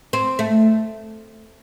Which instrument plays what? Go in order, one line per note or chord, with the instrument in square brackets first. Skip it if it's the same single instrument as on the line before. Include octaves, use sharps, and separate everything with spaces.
[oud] C4
A3